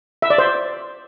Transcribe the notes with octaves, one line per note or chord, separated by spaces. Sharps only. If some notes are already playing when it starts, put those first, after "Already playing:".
E5
D5
C5